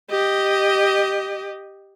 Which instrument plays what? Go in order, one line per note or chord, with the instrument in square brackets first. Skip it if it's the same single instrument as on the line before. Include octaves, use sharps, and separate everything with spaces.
[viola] G4 D#5